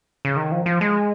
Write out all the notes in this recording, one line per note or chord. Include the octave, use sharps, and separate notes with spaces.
C#3
D#3
F3
F3
G#3